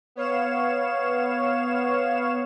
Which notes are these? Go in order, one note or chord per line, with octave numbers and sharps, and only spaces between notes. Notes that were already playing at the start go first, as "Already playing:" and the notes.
B3 C#5 F5 E7